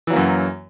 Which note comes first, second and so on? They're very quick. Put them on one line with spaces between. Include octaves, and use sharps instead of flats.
E3 F#3 A#3 F#2